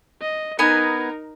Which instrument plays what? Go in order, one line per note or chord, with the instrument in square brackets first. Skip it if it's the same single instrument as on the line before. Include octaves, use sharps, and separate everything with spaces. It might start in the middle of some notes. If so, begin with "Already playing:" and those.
[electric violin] D#5
[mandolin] B3 G#5 [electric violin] D#4 A#4